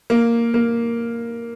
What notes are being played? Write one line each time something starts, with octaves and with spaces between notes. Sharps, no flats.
A#3
A#3